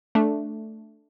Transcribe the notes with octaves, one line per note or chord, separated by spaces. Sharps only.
A3 D4